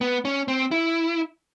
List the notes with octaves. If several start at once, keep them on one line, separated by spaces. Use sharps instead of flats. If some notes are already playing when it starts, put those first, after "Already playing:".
B3
C#4
C4
E4